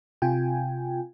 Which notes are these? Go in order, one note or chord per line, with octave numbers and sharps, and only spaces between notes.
C3 F4 G5 G#5